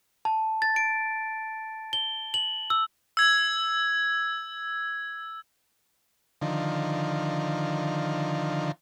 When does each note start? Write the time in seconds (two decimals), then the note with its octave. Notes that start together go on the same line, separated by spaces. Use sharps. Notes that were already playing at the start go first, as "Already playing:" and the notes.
0.25 A5
0.62 A6
0.76 D7
1.93 G7
2.34 F#7
2.70 E6
3.17 E6 G#6
6.42 D3 D#3 F3